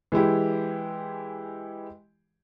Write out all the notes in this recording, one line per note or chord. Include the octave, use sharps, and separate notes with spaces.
E3 G#3 E4 G4